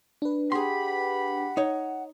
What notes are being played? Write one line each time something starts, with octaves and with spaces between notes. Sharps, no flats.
D4 B4
G4 G#4 F#5 B5 C6
D#4 C#5